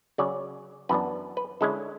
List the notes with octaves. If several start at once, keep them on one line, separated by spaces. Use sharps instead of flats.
C#3 F#3 C#4 D5
F#2 E3 B3 D4 B4
B4
D3 G#3 C#4 E4 A4